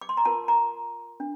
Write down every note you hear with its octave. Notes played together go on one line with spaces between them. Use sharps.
D6
C6
A#5
F4 A#4 A5
A#5
D4